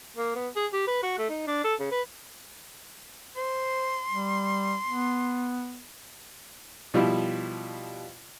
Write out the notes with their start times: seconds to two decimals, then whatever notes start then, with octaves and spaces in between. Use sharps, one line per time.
0.17 A#3
0.35 B3
0.56 G#4
0.73 G4
0.87 B4
1.03 F#4
1.18 A3
1.29 D#4
1.47 D4
1.64 A4
1.80 C#3
1.91 B4
3.36 C5 C6
4.11 G3
4.87 B3
6.94 B2 F3 G3 E4